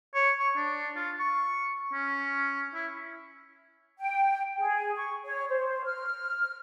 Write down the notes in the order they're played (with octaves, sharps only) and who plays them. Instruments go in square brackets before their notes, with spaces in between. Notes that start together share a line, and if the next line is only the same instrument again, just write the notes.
[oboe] C#5
C#6
D4
F4
C#6
C#4
E4
[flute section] G5
G#4
C#6
C#5
C5
F6